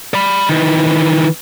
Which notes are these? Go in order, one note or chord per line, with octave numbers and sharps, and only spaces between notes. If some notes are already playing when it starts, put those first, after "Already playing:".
D5 B5
D#3 E3